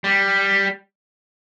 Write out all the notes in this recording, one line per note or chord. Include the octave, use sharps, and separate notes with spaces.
G3